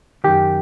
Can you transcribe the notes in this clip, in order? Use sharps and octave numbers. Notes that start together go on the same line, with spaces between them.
F#2 D#3 G4